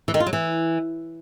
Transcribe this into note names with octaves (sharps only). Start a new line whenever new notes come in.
E3
D#3
F4
F#3
E3